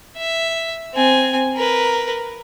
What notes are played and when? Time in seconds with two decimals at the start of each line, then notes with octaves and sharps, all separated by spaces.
0.17 E5
0.94 C4 G#5
1.56 A#4 B4